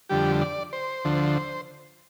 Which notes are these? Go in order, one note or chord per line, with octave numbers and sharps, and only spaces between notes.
F2 D3 G3 G4
D5
C5
D2 D3 F3